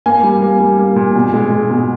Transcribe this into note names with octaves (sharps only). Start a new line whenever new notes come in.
A#3 G#5
G3
A#3
G3
A#3
A#2
B2
G#3
G#3
B2